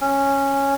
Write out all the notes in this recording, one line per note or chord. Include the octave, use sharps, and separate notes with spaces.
C#4